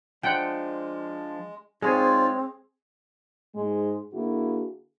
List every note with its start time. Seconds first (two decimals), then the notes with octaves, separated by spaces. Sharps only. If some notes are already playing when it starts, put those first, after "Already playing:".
0.23 F3 G#3 D4 F#5 G5
1.82 G#2 G#3 C4 F4 G#4 C#5 D5
3.54 G#2 G#3
4.13 D3 A#3 E4 F#4 G#4